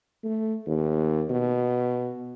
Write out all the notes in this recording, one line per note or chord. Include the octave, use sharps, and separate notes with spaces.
A3
D#2
B2